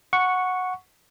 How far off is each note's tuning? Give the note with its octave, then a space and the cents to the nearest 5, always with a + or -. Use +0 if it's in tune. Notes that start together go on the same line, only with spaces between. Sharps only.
F#5 -10 C#6 +0